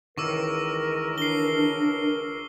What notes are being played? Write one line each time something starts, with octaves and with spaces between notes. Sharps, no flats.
C#2 D#3 E3 A#4 C#6 D6 E6
D4 C7 G7